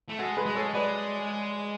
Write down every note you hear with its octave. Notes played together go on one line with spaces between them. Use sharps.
A3
G#3 F#4 A4
G#4 B4
G#3
A4 C#5
G#3 B4 D5